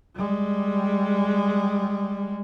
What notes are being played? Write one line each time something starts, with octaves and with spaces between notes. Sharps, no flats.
G3 G#3